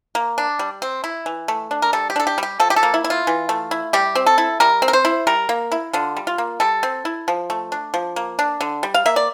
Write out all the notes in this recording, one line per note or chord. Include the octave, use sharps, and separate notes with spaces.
A#3
D4
G3
C4
E4
E3
A3
D4
A#4
G3 A4
G4
D4 A4
G4
G3 G4
F3 A4
G4
A4
A#3
E4
E4
F4
E3
A3
E4
G3 G4
C4
A4
E4
G3 A#4
C4
A#4
C5
E4
G3 A#4
A#3
E4
D3 F4
G3
F4
A#3
G3 A4
C4
E4
F3
A3
D4
F3
A#3
D4
D3
G3
F5
A#3 E5
D5